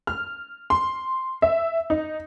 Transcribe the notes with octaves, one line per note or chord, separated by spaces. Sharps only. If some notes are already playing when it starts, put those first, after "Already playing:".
F6
C6
E5
D#4